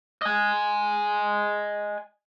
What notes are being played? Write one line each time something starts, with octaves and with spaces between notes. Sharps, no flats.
D#5 G#5